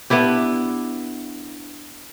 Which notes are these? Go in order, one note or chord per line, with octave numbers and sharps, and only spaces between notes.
B3 D4 E4 G4